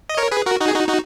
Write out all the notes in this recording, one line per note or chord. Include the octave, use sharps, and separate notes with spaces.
D#5
A#4 C#5
G#4 B4
F#4 A#4
D#4 F#4
G#4
D#4 F#4
D#4 F#4